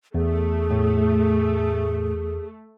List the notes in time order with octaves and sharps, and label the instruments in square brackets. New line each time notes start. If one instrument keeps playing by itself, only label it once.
[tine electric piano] E2 [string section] A3 [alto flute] G#4
[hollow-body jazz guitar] A2